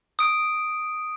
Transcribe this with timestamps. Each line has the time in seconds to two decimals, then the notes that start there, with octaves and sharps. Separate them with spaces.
0.19 D#6 D7